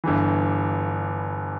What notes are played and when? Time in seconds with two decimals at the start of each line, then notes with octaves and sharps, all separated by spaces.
0.04 G1 G2 E3